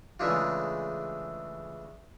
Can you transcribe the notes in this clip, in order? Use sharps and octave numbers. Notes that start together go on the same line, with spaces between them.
C#3 E3 G#3 A3 D4 F4